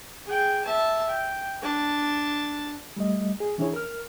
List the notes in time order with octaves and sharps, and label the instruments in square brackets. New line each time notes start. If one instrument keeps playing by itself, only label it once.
[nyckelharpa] G#4 G5
E5 A5
G5
D4 A5
[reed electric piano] G3 A3 D#5
G#4
E3 C#4 D4 E4 G#4 C#5
A#4 F6